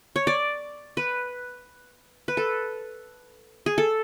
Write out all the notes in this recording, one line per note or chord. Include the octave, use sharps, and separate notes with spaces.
C#5
D5
B4
B4
A4
G#4
A4